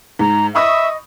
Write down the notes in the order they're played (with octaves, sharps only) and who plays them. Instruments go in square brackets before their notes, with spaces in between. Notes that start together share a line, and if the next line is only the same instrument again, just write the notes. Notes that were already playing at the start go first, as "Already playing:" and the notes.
[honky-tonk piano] G#2 [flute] A#5
[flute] D#5 [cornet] E5 [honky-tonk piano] B5 C#6 D#6